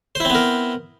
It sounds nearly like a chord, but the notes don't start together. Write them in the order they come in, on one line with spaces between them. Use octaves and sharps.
C5 E4 C4 B3 A#4